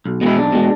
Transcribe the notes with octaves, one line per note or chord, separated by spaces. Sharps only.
B1
B2 G#3 E4
B1 D4
B2 G#3